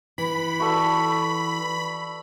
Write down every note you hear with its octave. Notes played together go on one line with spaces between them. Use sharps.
E3 B5
F#4 A4 D5